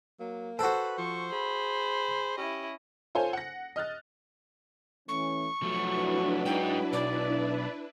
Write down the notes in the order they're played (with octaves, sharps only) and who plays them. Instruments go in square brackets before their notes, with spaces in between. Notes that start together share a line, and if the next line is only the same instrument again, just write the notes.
[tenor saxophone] F#3 [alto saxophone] A#3
[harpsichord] F#4 A4 [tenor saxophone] B4 [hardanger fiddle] C5
[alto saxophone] F3 [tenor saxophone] C5 [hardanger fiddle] C#6
[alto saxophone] G#4 [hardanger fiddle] B5
[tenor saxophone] C#4 [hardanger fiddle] E4 D#5 [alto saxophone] G4
[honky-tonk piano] F4 A4 C5 C#5 G#5
F#5 A#6
D#5 F6 F#6 A6
[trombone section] E3 A3 C#4 [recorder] C#6
[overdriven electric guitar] F3 A3 [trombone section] F#3 F#4 [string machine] D4 E4 B4
[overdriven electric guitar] G#3 D#4 [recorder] G5
[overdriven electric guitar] B1 [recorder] D5